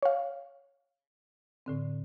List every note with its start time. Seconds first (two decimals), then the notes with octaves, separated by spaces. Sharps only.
0.03 C#5 F5
1.66 A2 D3 C4